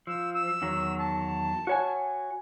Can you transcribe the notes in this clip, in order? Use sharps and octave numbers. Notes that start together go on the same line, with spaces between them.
F3 E6
E6
E2 D#3 F#3
A5
F#4 C#5 G#5